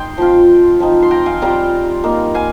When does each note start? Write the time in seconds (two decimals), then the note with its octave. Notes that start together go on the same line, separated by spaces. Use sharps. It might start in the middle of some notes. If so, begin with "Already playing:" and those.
Already playing: D#4 G5 C6
0.18 F3 C4 F4
0.80 F3 C4 D#4
1.02 C6
1.11 G5 A#5
1.26 F5 G#5
1.42 G3 C4 F4 G5 A#5
2.04 A#3 D#4
2.35 F5 G#5